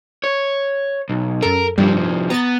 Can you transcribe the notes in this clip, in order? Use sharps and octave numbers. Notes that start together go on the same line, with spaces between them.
C#5
B1
F#2 A4 A#4
C2 G2 F3 G3
B3 A#5 A6